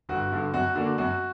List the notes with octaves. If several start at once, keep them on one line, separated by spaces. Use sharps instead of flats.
G1 F#4
G2 D3
F#2 F#4
D3 A#3 D4 F#4
F#2 F#4